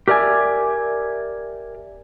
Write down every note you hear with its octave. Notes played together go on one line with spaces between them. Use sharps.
G4 A#4 D5 E5 G#5